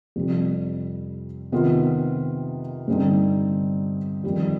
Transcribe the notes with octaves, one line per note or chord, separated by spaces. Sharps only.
F2 C3 G3
C3 D#3 B3 F4
G2 D3 G3 C4 D#4
F2 D#3 G3